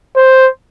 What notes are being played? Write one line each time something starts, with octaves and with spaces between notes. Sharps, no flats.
C5